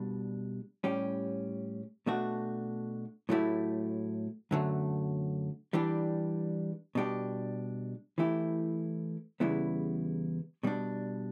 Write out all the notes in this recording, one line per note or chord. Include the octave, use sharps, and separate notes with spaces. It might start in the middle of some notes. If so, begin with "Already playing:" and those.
Already playing: B2 G3 D4
A2 G3 C#4 G4
B2 A3 D4 F#4
A2 F#3 A3 E4 G4
F#2 D3 F#3 A3
E3 G3 D4 G4
B2 G3 D4 G4
E3 A3 E4 G4
E2 C#3 G3 B3 E4
B2 G3 D4